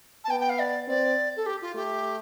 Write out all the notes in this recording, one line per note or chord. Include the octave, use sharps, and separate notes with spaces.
A5
B3 G5
G5
F5
D5
C4 D5
A4
G4
F4
A3 G4